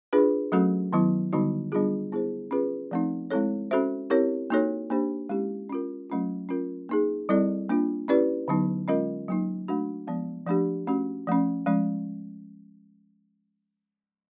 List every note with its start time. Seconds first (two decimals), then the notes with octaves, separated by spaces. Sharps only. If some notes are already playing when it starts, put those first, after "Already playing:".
0.13 D4 F4 G#4 B4
0.52 F#3 A3 C#4 F#4 A4
0.93 D#3 F#3 B3 E4
1.33 D3 G3 B3 D#4 F#4
1.72 G3 B3 D4 F4 G#4
2.12 B3 E4 G#4 C5
2.51 C#4 F4 G#4 B4
2.91 F3 A3 C4 D#4
3.30 G#3 C4 E4 A4 C#5
3.71 C#4 F#4 A4 C5 E5
4.10 C4 E4 G4 A#4 C#5
4.50 A#3 D#4 F#4 A4 C#5
4.90 A#3 D4 G4 C5
5.29 G#3 C#4 E4 G4
5.70 C#4 F4 A#4
6.10 F#3 A3 C#4 F4
6.49 C#4 F4 A#4
6.89 A#3 D#4 G#4
7.29 G3 C4 E4 A4 D5
7.69 A#3 D4 F4
8.08 C#4 E4 G4 B4 D5
8.48 D3 F#3 B3 D#4
8.88 G#3 C#4 F4 A#4 D#5
9.29 F#3 A#3 D#4
9.68 A3 D4 F#4
10.07 F3 G#3 B3
10.47 F3 A3 D4 G4
10.87 A3 C#4 F#4
11.27 F3 A3 C#4
11.66 F3 G#3 C#4